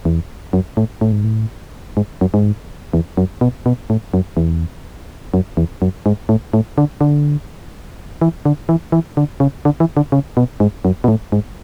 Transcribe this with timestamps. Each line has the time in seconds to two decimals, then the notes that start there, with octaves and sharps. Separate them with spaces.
0.05 E2
0.53 F#2
0.77 A2
1.01 A2
1.12 G#2
1.24 A2
1.97 G#2
2.21 F#2
2.34 G#2
2.93 E2
3.17 F#2
3.41 B2
3.66 B2
3.90 A2
4.14 F#2
4.37 E2
5.34 F#2
5.57 E2
5.82 F#2
6.06 G#2
6.29 A2
6.53 A2
6.78 D3
7.01 D3
8.21 E3
8.45 D3
8.69 E3
8.92 E3
9.17 D3
9.40 C#3
9.65 D3
9.80 E3
9.97 D3
10.12 C#3
10.37 B2
10.60 G#2
10.85 F#2
11.04 B2
11.08 A2
11.32 G#2